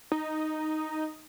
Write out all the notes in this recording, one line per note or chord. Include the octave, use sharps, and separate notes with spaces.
D#4